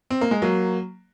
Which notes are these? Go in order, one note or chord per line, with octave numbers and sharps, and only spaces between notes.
C4
A#3
G#3
F#3 A#3